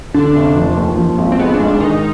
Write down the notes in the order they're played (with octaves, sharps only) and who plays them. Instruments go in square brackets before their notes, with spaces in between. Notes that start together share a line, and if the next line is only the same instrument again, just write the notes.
[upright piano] D3 [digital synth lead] D4
[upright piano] F1
F3
D#2
F3
G#1
[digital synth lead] C4
[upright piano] G#3 [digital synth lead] B3
[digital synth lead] D4
[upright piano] G#2
[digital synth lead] D4
[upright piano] D#3 [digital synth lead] D#4